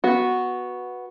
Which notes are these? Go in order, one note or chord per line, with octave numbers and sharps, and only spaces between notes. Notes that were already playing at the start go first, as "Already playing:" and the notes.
B3 F#4